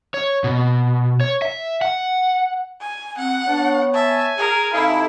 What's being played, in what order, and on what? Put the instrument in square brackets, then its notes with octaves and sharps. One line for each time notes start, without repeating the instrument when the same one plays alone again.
[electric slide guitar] C#5
B2
C#5
E5
F#5
[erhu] G#5
[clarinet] C4 [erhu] F#5
[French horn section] B3 C#5 [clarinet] D4
[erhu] E5 [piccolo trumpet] G#5 [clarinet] A5
[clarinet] G#4 [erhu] A#4
[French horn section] C3 D#4 A4 [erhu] E4 [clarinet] F5